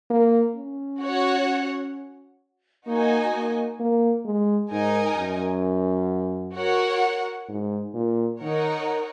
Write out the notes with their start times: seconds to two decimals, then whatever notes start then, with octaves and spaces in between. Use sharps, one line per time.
0.10 A#3
0.56 C#4
1.02 F#4 C#5 F#5
2.87 A#3 D#4 F#4 D#5 G#5
3.33 A#3
3.80 A#3
4.25 G#3
4.71 G#2 D#4 A#4 D#5 G#5
5.17 F#2
6.56 F#4 A#4 C#5 F#5
7.49 G#2
7.94 A#2
8.41 D#3 D#4 A#4 C#5 F#5